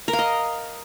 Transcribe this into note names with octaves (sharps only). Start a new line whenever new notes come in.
A#4
F5
D#5